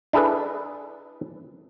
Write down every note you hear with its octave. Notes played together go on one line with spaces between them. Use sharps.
D4 E4 G#4 A4 B4